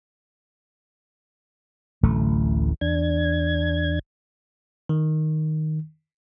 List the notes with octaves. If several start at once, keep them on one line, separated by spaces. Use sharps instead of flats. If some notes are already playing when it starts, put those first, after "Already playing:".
D1 A1 A3
E2 D4 G#6
D#3